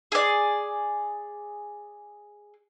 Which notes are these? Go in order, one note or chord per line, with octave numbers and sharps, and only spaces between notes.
G#4 D5